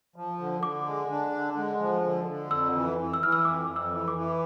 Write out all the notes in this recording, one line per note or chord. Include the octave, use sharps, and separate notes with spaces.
F3
D3
D3 D6
G#3
D4
D3
G#3
F3
D3
D3
F2 E6
E3
E3
E6
E3 F6
E6
F2 D6
F2
E6
E3
D6
E3